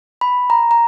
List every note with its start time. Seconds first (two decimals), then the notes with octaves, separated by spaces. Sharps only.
0.21 B5
0.50 A#5
0.71 A#5